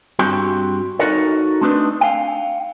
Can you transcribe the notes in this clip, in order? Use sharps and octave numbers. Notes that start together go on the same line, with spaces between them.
G2 C4 F#4 G4 G5
D#4 F4 F#4 A4 A#4 C#5
A3 C4 D4 D#4 B4
F5 G5